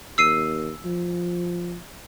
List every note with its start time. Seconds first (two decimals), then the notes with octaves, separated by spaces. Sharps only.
0.18 D#2 E6 C7 D#7
0.85 F3